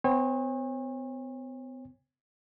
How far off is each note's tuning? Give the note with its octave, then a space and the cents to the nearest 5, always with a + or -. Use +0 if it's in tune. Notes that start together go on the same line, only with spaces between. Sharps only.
B3 +45 C#5 -35 G#5 -45